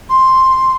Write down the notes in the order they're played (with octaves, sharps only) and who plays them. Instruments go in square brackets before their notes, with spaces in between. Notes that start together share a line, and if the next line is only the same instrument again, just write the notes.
[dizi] C6